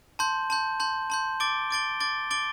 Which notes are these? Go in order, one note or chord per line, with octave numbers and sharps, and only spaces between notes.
A5 C6 G6
A5 C6 G6
A5 C6 G6
A5 C6 G6
D6 A6 D7 G7
D6 A6 D7 G7
D6 A6 D7 G7
D6 A6 D7 G7